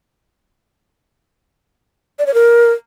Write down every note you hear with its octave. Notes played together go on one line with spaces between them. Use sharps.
D5
C#5
A#4